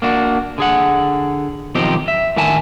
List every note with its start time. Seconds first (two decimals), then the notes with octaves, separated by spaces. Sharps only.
0.02 A#3 D4 F#4
0.58 D3 G#4 F#5
1.75 B1 D#3 F3 C4 D#4 G4
2.08 E5
2.36 A2 D3 D#3 E5 G#5 A5